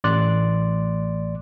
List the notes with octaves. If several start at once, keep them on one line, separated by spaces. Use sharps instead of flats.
A1 D5 C6 F#6